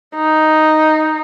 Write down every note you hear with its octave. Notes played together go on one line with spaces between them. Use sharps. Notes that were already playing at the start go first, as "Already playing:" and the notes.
D#4